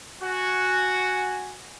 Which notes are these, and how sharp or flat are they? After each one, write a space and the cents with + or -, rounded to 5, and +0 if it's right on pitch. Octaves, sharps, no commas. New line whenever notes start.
F#4 +0 G#5 +0